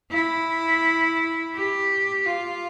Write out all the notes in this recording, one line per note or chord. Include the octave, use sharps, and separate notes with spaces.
E4
G4
F4